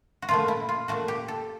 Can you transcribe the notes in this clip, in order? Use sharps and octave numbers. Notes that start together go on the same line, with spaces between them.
F#4
A#2 F3 A3 F4
E4
F4
A#2 F3 A3 F#4
G4
A4